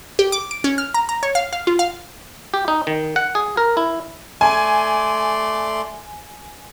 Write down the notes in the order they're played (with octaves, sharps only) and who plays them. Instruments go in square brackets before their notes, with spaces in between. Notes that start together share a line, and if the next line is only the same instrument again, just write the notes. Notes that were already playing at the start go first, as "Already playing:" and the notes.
[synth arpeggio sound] G4
D6
D7
C#4
F6
A#5
A#5
C#5
F5
F5
F4
F5
[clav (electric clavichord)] G4
D#4
D#3
F#5
G#4
A#4
E4
[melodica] A3 D5 C6 [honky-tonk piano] G#5